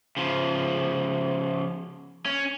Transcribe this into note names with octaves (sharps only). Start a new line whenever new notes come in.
C#3 F3
C#4